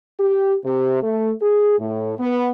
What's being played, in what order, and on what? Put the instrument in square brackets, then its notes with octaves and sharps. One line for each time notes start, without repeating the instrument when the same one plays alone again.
[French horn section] G4
C3
A3
G#4
A2
B3